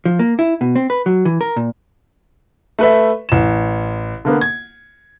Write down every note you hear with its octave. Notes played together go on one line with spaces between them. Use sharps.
F3
A#3
E4
B2
C4
B4
F#3
E3
A#4
A#2
A3 B4 E5
A1 E7
D3 A#3 B3
G#6